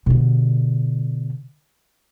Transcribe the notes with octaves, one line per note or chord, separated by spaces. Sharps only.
B2 D3